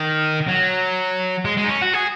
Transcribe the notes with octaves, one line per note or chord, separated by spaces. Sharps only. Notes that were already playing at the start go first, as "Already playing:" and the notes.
Already playing: D#3
F#3
G#3
G#3
D#4
C#4
F#4
G#4